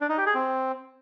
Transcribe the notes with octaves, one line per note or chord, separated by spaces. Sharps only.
D4
D#4
G4
G#4
C4